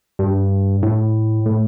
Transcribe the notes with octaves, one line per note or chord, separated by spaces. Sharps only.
G2
A2
A2